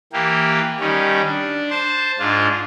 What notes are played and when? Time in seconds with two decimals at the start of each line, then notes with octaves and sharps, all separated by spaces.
0.13 E3 A#3 G4
0.81 D#3 G3 C#4
1.26 D4
1.70 C5 A5
2.19 G#2 D4 F4